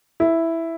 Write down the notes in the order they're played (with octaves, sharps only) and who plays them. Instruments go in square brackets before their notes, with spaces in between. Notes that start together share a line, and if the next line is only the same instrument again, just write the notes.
[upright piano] E4